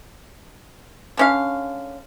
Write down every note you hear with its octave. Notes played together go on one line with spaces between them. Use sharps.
D3 C#4 F5